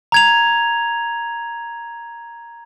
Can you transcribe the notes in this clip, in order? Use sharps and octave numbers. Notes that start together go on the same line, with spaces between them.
A#5 G#6 F7